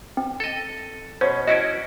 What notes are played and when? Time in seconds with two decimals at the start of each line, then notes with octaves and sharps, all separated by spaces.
0.17 C4
0.40 A4 D#5
1.21 B2 C#4 C5 C#5 C7
1.48 C#4 E4 F#4 D#5 D7